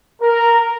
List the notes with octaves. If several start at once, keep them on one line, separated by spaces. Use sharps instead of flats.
A#4